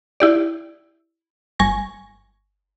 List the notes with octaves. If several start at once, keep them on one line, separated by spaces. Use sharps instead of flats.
E4 G4 D5
G1 G#5 C#6 A#6